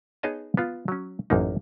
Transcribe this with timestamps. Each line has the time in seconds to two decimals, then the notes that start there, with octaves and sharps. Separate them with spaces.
0.23 B3 D#4 G#4 C#5 D#5 A5
0.57 B3 F4
0.88 F#3 C#4
1.30 A1 F#2 A#3 D#4